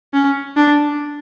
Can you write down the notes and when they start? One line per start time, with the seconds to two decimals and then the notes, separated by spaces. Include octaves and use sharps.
0.14 C#4
0.57 D4